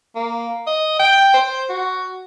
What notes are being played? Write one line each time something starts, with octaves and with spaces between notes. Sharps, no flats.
A#3
D#5
G5
C5
F#4